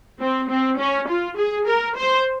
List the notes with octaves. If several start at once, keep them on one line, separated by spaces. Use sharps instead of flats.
C4
C4
C#4
F4
G#4
A#4
C5